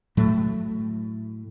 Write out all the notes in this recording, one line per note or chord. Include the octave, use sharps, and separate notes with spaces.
A2 F#3 A3